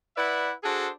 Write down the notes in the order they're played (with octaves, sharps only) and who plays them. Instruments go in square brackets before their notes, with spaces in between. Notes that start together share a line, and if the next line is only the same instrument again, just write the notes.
[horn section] E4 B4 D5 E5 F#5
D4 F#4 G#4 A4 C5